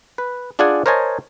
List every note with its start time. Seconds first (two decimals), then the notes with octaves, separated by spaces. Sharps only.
0.18 B4
0.59 D4 F4 G#4 D5 F#5 G#5
0.86 A#4 C5 C#5 D#5 G#5 A5